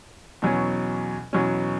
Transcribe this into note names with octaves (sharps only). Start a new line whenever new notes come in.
E2 B2 F#3 C#4
E2 B2 F#3 C#4